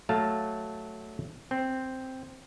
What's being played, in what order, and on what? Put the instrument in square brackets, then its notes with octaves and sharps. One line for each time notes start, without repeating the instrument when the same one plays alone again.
[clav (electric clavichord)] F#3 A3 F5 A5 A#5
C4